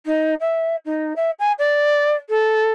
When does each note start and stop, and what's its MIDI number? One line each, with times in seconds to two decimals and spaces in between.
0.06 0.34 63
0.40 0.76 76
0.85 1.13 63
1.16 1.30 76
1.39 1.52 80
1.59 2.12 74
2.29 2.71 69